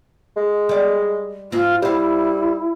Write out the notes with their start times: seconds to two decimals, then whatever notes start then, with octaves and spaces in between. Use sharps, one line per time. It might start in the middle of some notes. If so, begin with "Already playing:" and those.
0.37 G#3
0.69 G3 D5
1.52 G#2 C4 F4
1.82 G3 E4 C5 F5